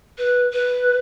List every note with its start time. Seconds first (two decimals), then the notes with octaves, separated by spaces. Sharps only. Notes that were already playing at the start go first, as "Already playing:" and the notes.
0.18 B4
0.53 B4